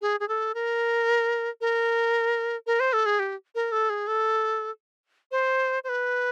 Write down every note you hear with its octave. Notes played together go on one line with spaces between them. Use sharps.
G#4
G#4
A4
A#4
A#4
A#4
C5
A4
G#4
G4
A#4
A4
G#4
A4
C5
C5
B4